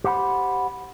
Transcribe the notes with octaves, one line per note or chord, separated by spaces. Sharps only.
G4 C5 F#5 A#5 B5